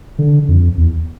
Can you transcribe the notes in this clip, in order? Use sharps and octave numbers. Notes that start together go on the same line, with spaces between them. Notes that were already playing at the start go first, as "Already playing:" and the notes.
D3
F2
E2